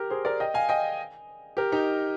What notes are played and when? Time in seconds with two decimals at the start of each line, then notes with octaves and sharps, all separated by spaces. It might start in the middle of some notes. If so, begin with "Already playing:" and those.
Already playing: G4 A#4
0.10 G#4 C5
0.25 A#4 D5
0.40 D#5 G5
0.54 F5 G#5
0.69 D#5 G5
1.57 G4 A#4
1.72 D#4 G4